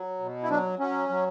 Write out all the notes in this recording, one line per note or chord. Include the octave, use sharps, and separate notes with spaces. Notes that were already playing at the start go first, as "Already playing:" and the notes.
Already playing: F#3
B2
E4
F#3 D4
F#3 C#4
F#3